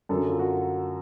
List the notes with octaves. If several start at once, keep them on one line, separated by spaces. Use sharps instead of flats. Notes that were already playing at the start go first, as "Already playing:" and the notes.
F#2 D3 F#3 A4
F4
F#4